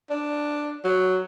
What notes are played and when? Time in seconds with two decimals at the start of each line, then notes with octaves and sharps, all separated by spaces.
0.10 D4
0.84 F#3